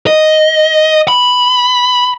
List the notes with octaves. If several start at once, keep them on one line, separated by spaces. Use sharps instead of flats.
D#5
B5